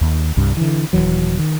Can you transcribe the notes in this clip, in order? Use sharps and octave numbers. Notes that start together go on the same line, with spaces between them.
D#2
C2 G2
D3 E3
D#1 E2 E3 F#3
D#3